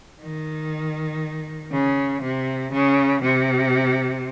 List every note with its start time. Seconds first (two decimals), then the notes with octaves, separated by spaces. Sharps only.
0.22 D#3
1.72 C#3
2.22 C3
2.72 C#3
3.22 C3